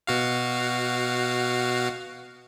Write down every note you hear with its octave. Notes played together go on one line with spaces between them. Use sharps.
B2 F#4 F5